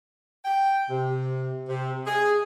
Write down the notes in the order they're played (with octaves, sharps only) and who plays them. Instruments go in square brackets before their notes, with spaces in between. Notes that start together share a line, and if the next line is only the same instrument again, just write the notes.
[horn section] G5
C3
C3
G#4